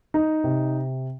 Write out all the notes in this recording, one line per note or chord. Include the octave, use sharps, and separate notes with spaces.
D#4
C3